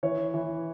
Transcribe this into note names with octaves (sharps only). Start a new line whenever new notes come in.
E3 C#5
E3